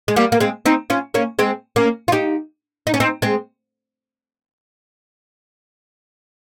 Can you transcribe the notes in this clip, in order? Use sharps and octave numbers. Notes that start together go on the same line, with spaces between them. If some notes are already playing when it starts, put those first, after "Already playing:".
G#3
G3 A#3
A#3
G#3 C4
C4 D#4
C#4 F4
A#3 C#4
G#3 C4
A#3 C#4
F4
D#4 G4
D#4
C#4
C4 D#4
G#3 C4